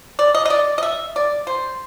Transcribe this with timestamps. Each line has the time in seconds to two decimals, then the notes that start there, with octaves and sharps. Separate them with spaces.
0.19 D5
0.34 D#5
0.45 D#5
0.50 D5
0.78 D#5
0.83 E5
1.16 D5
1.47 C5